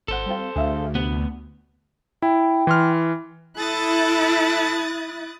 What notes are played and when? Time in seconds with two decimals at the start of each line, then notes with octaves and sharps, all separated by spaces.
0.08 G#1 A4 C5 F#5
0.26 G3 C4 F4
0.56 D2 G#4 E5 F5
0.95 C3 B3
2.22 E4 G5
2.67 E3 C6 F6
3.58 E4 A4 D#6 F#6 A6